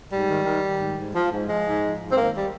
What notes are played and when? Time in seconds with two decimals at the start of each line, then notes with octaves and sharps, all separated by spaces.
0.11 G#2 G3
0.29 D#3
0.45 D#3
0.63 D#3
0.80 G#2
0.97 G#2
1.15 F3
1.32 G#2
1.48 F3 G#3
1.66 G#2
1.83 F3
2.00 G#2
2.11 C4
2.17 D#3 A#3
2.35 G3